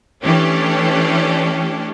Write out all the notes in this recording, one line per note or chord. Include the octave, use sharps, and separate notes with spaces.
E3 A3 C#4 D4 G4